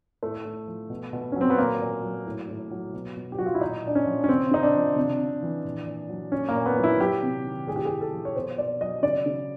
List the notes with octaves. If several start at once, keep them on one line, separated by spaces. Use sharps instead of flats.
A2 A3
A2
F3
B2
B2
C#4
F#3 C4
B3
A#2 A#3
A#2
F#3
A2
A2
F#3
B2
B2
G4
F#3 F#4
F4
E4
A#2 D#4
A#2 D4
C#4
F3
C#4
C#3 C4
C#3 D#4
D4
F3
C3
C3
E3
A#2
A#2
F#3
A#2 C#4
A#3
A#2
B3
F#3
E4
F#3 G4
C3
D#3
A2 G#4
G4
G#4
A2
A4
F3
C#5
B2 C5
B2 D5
F#3 D#5
C#3 D5
C#3